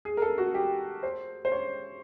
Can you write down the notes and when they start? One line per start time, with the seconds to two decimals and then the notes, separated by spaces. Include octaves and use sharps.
0.05 G#4
0.17 A#4
0.22 A4
0.38 F#4
0.54 G4
1.03 C5
1.45 C5
1.52 C#5